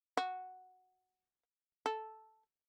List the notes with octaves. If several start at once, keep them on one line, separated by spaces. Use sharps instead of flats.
F#4
A4